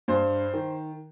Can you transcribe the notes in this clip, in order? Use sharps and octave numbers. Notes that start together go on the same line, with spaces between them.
G2 C5
D#3